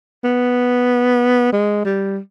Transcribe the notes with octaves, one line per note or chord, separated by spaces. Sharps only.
B3
G#3
G3